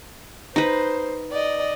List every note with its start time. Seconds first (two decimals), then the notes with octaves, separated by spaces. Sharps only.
0.56 D#4 B4 C5
1.32 D5 D#5